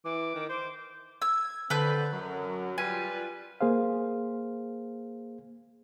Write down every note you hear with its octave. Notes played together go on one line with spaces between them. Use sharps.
E3 D6
D#3
C5 D6
E6 G#6
D3 C4 A4 B4 G6
F#2 F#3
G3 F4 B4 G#5
A#3 G#4 C5 F5